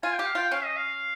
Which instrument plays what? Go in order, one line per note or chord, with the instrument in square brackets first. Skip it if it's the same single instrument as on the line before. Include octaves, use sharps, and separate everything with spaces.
[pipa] F4 [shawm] G#5
[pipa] G4 [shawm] G5
[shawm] F5
[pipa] F4 [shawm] G5
[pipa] C#4 [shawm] F5
[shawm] D#5
F5